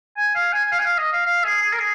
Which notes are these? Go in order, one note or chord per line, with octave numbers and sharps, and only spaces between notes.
G#5
F5
G#5
G#5
F5
G#5
F5
D#5
F5
F5
G#4
G#4
A#4
G#4